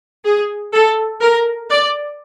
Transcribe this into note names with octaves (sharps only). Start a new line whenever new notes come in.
G#4
A4
A#4
D5